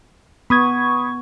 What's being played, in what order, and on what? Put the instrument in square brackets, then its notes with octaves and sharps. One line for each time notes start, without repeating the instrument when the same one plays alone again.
[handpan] B3 [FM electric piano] B5 D#6 G#6 [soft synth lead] C#6